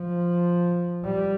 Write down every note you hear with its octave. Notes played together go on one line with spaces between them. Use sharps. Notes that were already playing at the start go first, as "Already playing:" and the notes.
Already playing: F3
G3